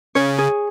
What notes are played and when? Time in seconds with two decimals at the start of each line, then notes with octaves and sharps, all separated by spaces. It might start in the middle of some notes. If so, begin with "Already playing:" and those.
0.15 C#3 C#5
0.38 G#4